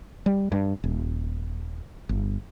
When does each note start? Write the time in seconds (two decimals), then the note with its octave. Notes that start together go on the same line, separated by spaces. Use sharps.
0.26 G3
0.52 G2
0.84 D#1
2.09 G1